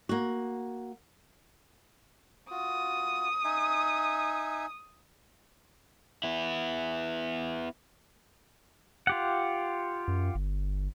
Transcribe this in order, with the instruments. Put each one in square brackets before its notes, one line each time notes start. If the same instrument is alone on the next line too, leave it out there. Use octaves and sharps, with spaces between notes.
[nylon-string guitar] A#3 F#4
[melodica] F4 F#4 [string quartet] D#6
[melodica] D#4 E5 G#5
[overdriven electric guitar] B3 E4
[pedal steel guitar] F4 G4 F#5
[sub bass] F#2
G1